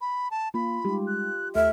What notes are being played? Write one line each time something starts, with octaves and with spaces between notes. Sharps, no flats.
B5
A5
A#3 F4 B5
G3 G#3 D#4 G4
F#6
D#2 A3 A4 E5 F6